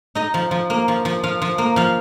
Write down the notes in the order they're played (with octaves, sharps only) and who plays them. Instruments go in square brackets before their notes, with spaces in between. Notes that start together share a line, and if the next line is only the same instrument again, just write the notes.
[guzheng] D#4 D#5
F3
F3
A#3
F3
F3
F3 F5
F3
A#3
F3 F5